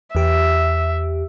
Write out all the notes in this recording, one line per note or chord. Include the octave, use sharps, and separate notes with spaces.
E2 G4 E5